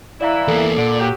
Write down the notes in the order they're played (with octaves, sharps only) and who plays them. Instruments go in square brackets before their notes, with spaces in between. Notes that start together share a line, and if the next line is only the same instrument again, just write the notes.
[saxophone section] E3 E4 [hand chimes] D5 F5 A#5
[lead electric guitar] E2 A#3 [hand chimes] A4
[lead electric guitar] A#2 [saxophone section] D3 D5
[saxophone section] F#3 G4